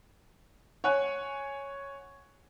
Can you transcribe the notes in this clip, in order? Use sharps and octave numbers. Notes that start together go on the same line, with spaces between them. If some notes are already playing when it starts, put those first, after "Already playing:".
C#5 F#5 G#5 F#6